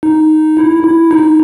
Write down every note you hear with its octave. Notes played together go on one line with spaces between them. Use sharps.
D#4
E4
E4
D#4